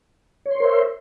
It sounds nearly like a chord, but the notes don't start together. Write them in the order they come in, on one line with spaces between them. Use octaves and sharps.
C#5 C6 C5 A#4 E5